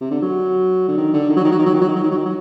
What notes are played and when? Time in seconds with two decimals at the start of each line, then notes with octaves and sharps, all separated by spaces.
0.01 C3
0.11 D3
0.22 F#3
0.88 D3
0.97 D#3
1.13 D3
1.29 D#3
1.36 F#3
1.44 D#3
1.52 F#3
1.59 D#3
1.66 F#3
1.74 D#3
1.81 F#3
1.88 D#3
1.96 F#3
2.03 D#3
2.11 F#3
2.18 D#3
2.25 F#3